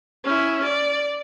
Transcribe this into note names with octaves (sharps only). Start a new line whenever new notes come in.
C#4 E4
D5